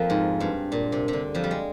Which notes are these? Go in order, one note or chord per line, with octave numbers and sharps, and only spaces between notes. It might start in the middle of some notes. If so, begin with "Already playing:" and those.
Already playing: F2 F3 A#3
G#2
G2
A#2
C3
C3
D3
F2 F3
G3
G#3